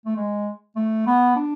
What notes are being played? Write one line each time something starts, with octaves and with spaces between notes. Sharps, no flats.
A3
G#3
A3
B3
D4